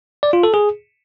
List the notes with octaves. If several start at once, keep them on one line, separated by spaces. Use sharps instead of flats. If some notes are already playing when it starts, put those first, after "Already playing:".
D5
F4
A4
G#4